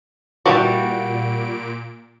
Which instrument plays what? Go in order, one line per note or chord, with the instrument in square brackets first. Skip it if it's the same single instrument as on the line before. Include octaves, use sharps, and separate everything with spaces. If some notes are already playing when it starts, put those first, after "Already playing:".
[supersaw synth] A#2 D7 [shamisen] E3 G4 D5 [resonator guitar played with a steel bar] G3 F#4